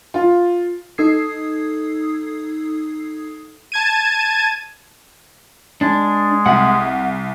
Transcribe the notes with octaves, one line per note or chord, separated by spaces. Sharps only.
F4
D#4 A4 D#6 E6 G#6 C7
A5 G#6 D#7
G#3 D4 G#4
C2 F#5